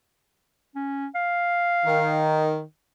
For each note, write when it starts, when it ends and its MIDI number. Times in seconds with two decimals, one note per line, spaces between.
0.75 1.07 61
1.15 2.47 77
1.84 2.61 51